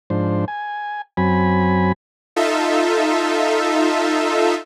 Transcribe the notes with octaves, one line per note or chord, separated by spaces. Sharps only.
G#2 F3 D4 C5
G#5
F#2 F#3 C4 G#5 B5
D#4 F4 A4 E5